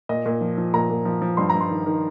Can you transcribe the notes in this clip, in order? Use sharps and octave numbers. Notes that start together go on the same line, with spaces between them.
A#2 D#5
A#2
F3
F3
A#2 A#5
A#2
F3
F3
G2 C6
G2 A#5
C6
D#3
D#3